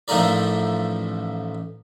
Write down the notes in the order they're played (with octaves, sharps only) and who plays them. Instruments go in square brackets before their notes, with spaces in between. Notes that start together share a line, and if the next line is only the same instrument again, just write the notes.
[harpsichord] A1 F3 A3 D#4 A#4 D5